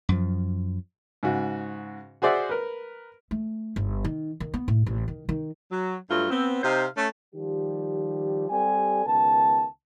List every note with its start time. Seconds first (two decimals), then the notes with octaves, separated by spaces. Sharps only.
0.09 F#2 F3
1.23 G#2 C#3 F#4
2.22 F#4 G#4 C5 D5 E5 F#5
2.49 A#4 B4
3.31 A3
3.76 G1
4.04 D#3
4.40 D#3
4.54 B3
4.68 A2
4.86 A1
5.08 D#3
5.29 D#3
5.71 F#3
6.10 G2 F#3 A3 F4
6.30 B3 C4
6.63 C3 D#4 C5 F5
6.97 A3 C#4
7.34 D#3 F3 G3 G4
8.50 G3 C4 G4 A4 D5 G#5
9.06 C#2 D#3 B3 A5